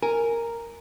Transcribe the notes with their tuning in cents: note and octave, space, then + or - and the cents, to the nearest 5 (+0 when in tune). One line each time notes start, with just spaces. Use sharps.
A#4 -5 G#5 +0